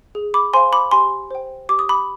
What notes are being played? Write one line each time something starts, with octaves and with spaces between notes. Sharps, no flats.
G#4
B5 D6
C5 F5 G#5 C6
B5 D6
G4 G#5 C6
C5 G5
G4 D6
D#6
B5 D6